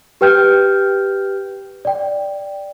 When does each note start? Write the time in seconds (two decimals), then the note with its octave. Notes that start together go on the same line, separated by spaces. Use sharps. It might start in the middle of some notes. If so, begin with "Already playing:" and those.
0.21 G4 B4 G5 F6 G6
1.85 D5 G5